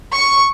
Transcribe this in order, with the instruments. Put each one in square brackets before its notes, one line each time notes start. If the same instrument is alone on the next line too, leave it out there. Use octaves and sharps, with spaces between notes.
[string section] C#6